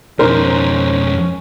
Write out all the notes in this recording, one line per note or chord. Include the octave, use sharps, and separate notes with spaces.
F2 B2 C#4 D#4 A#4 C5